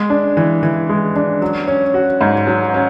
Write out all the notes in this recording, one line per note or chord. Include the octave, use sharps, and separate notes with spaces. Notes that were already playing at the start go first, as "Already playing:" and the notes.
Already playing: G#3
D4
E3
E3
G#3
D4
F#3
C#4
F#4
G#2
F#3
C#4